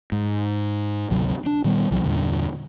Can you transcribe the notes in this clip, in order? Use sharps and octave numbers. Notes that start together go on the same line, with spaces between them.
G#2
G#1 D2 C3 F#3
D4
A#2 D#3 G3 B3
C2 E3 F#3
E2 G2 A#2 D3